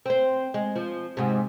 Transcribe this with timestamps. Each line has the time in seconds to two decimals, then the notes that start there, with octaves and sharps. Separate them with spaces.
0.06 C4 C5
0.54 G#3
0.76 F3
1.17 G#2 C3